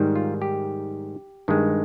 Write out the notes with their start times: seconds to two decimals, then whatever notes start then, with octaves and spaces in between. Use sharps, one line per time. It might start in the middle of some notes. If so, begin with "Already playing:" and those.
Already playing: G#2 D#3 G3
0.16 F4
0.42 G4
1.48 G2 D#3 G#3